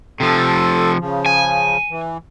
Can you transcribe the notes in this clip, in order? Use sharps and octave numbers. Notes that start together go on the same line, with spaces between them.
C3 F3 A4
C#3 F3
G#5
E3